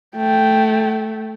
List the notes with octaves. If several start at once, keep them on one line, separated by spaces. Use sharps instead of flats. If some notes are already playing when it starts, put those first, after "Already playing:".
A3 G5